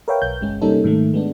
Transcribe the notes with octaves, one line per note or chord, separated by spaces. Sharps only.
A#4 B4 C#5 E5 F5 G5
B1 G6
G1 G#3 C#4
C3 G3 A#3 C#4 D#4 A4
G#2 D#3 A3
G#3 B3 D4